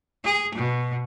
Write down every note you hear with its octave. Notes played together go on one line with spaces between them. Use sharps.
G#4
B2